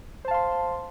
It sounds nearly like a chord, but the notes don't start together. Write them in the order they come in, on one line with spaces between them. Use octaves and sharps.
C5 A5 F5 C6